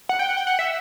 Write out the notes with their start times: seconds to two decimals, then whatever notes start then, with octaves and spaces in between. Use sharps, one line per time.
0.09 F#5
0.19 G5
0.29 F#5
0.37 G5
0.47 F#5
0.59 E5